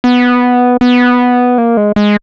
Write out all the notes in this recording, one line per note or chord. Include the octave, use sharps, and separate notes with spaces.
B3
B3
A#3
G#3
G#3